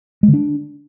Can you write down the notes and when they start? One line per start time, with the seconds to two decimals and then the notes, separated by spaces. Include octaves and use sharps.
0.23 G#3
0.28 D3
0.34 D4